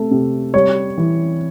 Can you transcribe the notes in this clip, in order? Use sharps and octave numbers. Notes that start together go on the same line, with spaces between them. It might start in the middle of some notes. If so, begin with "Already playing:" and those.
Already playing: C3 A3
C3
G3 C#5
E3